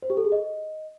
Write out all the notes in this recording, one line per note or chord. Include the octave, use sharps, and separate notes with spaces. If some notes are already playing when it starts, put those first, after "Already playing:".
C5
G4
A4
G#4
D#5